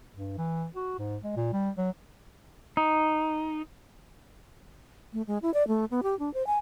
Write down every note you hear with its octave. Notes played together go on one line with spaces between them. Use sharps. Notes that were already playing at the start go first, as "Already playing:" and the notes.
G2
E3
F#4
G#2
G#3
A#2
G3
F#3
D#4
A3
G#3
E4
D5
A3
B3
G4
D4
C5
G#5